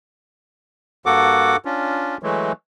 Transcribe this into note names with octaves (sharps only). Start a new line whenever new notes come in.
G2 A#3 F#4 A4 F#5 D6
C#4 D4 F4
E3 F#3 G#3 A3